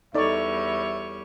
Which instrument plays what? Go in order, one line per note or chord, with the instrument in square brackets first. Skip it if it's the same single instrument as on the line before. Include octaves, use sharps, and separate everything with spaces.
[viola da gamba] E2 G3 C#5 [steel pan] D#4 D5 [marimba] A4 C#6 [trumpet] E5